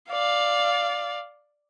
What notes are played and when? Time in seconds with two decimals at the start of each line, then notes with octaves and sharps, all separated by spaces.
0.11 D5 F5